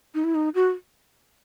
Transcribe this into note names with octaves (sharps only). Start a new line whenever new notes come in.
D#4
E4
D#4
F#4